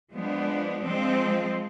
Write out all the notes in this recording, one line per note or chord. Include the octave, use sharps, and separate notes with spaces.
F3 G#3 B3 D4
F3 G#3 C4